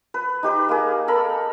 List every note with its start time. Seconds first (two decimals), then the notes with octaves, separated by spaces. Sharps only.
0.14 B4
0.43 D#4 G4 B4
0.69 A#3 G#4
1.08 A4 A#4 B5